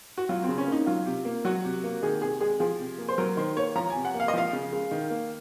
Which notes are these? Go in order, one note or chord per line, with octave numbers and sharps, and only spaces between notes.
F#4
F#3 F4
C#3 C4
C#4
A#3
D#4
F#3 F4
C3
A#3
F#3 F#4
C3
A#3
D#3 G#4
C3 G#4
G#3 G#4
F3 G#4
C3
A#3
C5
F#3 A#4
D#3 C5
A#3 C#5
F3 A#5
G#5
C3
F#5
A#3
F5
D#5
F3 F5
C#3
G#3
D#3
A#3